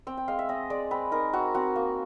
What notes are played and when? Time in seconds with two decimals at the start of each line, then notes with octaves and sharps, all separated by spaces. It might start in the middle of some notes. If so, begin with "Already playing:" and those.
0.07 C4 G5
0.17 G5
0.28 G#3 F5
0.39 E5
0.49 C4 D#5
0.70 G#3 D5
0.91 C4 B4
1.12 D#4 A#4
1.33 C4 F#4
1.55 C4 F#4
1.76 A#3